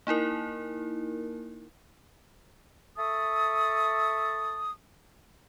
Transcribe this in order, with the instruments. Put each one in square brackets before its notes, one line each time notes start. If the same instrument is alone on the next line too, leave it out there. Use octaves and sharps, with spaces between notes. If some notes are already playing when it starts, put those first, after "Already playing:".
[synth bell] A#3 D#4 E4 A#4
[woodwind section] A4 E5 A5 C#6 D#6